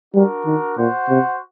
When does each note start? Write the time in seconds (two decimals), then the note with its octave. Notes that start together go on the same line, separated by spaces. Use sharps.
0.14 G3 D4 F#4 A#4
0.46 D#3
0.78 A#2 F#4 C5 F#5
1.09 C3